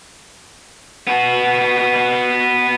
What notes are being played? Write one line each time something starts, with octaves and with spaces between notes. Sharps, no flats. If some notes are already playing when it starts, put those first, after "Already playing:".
B3 F#4